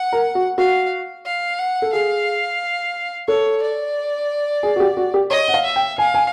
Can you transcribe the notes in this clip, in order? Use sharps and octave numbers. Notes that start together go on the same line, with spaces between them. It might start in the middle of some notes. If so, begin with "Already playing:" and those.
Already playing: F#5
A#4
F#4
F#4 F5
F5
F#5
A4
G#4 F5
A4 C#5
D5
G#4
F#4
G4
F#4
G4
C#5 D#5
F#5
F5
E5
G5
F5 G#5
G#5